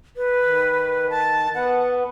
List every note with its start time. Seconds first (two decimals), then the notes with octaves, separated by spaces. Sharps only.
0.17 B4
0.42 D#3
1.10 A5
1.55 B3 B4 F#5